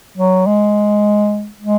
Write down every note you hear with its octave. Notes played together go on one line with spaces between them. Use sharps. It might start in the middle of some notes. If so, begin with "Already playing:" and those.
F#3
G#3
G#3